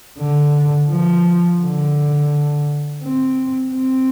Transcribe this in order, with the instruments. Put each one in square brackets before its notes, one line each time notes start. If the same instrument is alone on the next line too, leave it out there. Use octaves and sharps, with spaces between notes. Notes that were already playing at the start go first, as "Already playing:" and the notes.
[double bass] D3
F3
D3
C4
C4